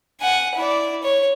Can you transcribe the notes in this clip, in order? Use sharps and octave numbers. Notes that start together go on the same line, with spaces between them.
F#5 G#5
E4 D5
C#5